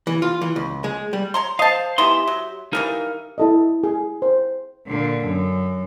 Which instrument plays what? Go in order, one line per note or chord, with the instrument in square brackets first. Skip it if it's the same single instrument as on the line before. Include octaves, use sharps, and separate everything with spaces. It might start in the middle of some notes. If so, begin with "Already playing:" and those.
[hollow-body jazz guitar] E3
F4
E3
C#2
G#3
G3
[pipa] C#5 A#5 C6
[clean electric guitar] C5 F5 [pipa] D#5 A5
[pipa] E3 B3 D#4 [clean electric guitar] G4 E5 C6
[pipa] F#3
[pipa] E3 G3 F5 [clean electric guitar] D#4 A#4
[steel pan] E4 A4 D#5
G#4
C5
[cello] A#2 D3
F#2